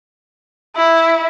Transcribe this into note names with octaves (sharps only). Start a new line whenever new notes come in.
E4